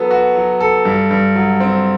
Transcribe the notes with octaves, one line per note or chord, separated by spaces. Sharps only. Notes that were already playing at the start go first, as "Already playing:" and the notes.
Already playing: F#3 B3 A4
F#4
F#3
A4
G2
G2
F#3
C4